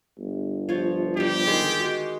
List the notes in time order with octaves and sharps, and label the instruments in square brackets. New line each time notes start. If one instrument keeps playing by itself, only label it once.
[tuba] G1
[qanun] F3 C#5
[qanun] F3 G3 [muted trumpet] G4
[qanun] D#3 G#3 G#4
G#3 F#4